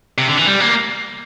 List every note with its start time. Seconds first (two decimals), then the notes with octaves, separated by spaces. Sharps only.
0.18 C3
0.28 D3
0.38 E3
0.47 G3
0.60 A#3